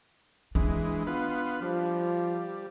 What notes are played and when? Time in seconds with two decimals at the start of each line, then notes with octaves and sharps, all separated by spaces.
0.55 E3 G#3 D4
1.07 B3 F4 B4
1.62 F3 G3